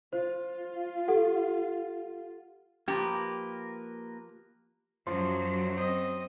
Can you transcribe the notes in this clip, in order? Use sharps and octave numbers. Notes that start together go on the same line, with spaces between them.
F4 C5
G4 A4 F#5
F3 A#3 G4 A#4 B4
F#2 F3 F#3 C6
C4 C5 D#5